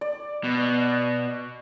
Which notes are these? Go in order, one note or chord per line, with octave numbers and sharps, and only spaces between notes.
D5
B2